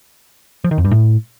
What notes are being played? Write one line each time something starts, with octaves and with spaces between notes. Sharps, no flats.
F3
D#3
F2
G2
A2